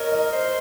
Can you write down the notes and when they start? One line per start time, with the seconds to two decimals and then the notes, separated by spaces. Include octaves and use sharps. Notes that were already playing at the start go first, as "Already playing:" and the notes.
Already playing: A#4 C#5 D#5
0.12 D#5
0.33 C5